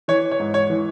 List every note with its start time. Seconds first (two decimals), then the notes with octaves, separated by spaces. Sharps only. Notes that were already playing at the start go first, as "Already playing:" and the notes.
0.08 E3 C#5
0.31 C#5
0.40 G#2
0.54 C#5
0.70 E3